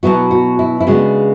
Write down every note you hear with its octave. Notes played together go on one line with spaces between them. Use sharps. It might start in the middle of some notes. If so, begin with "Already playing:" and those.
B2 F#3 B3 E4 F#4
F#4
E4
E4
C#3 G#3 B3 D4 F#4